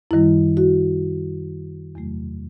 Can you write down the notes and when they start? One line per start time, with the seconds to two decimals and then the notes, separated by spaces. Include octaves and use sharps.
0.11 F#2 D#3 G3 E4
0.57 F#4
1.95 E2 C3 F#3 A3